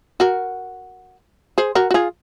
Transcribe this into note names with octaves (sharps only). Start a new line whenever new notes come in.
F#4 A#4
G#4 C5
F#4 A#4
F#4
F4 G#4